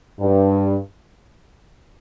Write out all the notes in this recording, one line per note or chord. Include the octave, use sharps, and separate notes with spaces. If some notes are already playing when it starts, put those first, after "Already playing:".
G2